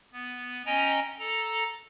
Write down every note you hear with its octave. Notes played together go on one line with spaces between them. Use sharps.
B3
C#4 D#5 G5 G#5 A#5
A4 A#5